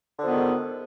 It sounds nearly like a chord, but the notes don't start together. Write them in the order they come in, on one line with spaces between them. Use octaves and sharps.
D3 F3 B3 D#3 G#2